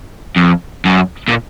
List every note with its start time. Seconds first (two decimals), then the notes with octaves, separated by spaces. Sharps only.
0.36 F2
0.85 F#2
1.28 A#2